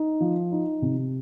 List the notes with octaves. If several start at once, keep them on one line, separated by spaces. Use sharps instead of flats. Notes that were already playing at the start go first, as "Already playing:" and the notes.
Already playing: D#4
F3
D#4
C3